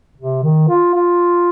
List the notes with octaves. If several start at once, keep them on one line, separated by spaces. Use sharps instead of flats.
C3
D#3
F4
F4